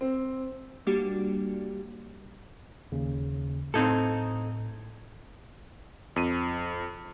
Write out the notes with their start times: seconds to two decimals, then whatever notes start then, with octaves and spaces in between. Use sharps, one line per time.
0.01 C4
0.87 G3 A#3 D4 F#4 G4
2.92 D#2 C#3
3.74 A2 C4 D#4 A4 G#6
6.16 F2 D#7